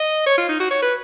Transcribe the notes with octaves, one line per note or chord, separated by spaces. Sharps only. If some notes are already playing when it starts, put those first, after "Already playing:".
Already playing: D#5
C#5
F4
D#4
F#4
C#5
B4